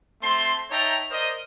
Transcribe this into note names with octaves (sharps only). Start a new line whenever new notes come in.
A3 C4 A5 C6
D#4 C#5 E5 G5 A5 A#5
A#4 C5 D5 D#5